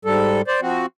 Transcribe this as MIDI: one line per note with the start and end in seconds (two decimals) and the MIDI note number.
0.05 0.42 44
0.05 0.42 55
0.05 0.42 69
0.47 0.61 72
0.47 0.61 74
0.62 0.86 53
0.62 0.86 60
0.62 0.86 66